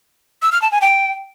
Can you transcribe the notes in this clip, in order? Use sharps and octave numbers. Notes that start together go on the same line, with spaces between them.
E6
F6
A5
G#5
G5